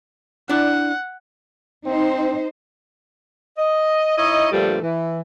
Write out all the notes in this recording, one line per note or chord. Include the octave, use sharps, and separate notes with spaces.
D4 E4 D5 F#5
C4 D#4 C5
D#5
D#4 E4 C#5 D#5
G2 A#2 D3 F3 G3 A3
E3